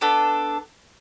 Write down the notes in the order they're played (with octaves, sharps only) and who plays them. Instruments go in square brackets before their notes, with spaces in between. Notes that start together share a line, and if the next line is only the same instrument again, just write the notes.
[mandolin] B3 D4 A4